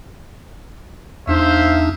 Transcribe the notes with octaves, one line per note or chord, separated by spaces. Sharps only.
E2 D4 D#4 C5 E5 F5